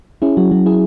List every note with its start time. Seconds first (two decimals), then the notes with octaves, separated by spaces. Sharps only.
0.22 C#4 E4 G#4
0.37 F#3 F#4
0.51 F#3 F#4
0.66 E4 G#4